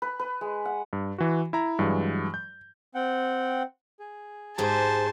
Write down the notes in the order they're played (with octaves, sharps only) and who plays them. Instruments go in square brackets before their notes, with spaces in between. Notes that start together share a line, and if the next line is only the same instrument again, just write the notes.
[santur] B4
B4
G#3
F#5
[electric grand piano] G2
E3 F#4
E4 A#5
G2 E3 F#3 G#3
G6
[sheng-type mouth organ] C4 F#5 G5
G#4
[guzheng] G#2 G4 [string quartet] C5 G#5 A5